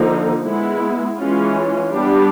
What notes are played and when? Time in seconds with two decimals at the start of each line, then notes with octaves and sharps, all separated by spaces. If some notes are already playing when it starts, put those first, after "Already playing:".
Already playing: D3 F3 A#3 D#4
0.43 G#3 B3 E4
1.18 E3 G#3 C#4 F4
1.93 G3 B3 D4 G4